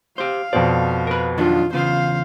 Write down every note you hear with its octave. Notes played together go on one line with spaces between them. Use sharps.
G4 C5 F5
F2 B2 C5 D5
A#4 B4
D#3 F#3 D4 F4
E2 C#3 F4 C5 F5